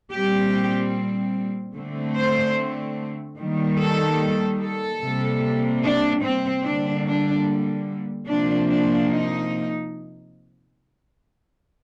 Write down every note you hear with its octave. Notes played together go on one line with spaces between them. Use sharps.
A#2 G3 C4 G4
D3 A3 C4
C5
D#3 G3 A#3
A4
A4
C3 G3 A#3
D4
C4
D3 G3 A#3 D4
D4
C3 F3 A#3 D4
D4
D#4